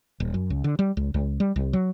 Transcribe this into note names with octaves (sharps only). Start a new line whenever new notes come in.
D#1
F#2
C#2
D3
G3
C#2
C#2
G3
C2
F#3